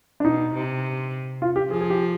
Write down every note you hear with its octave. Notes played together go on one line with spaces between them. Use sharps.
D4
B2 D#4
C3
F4
G4
F3 G#4
G#4
G4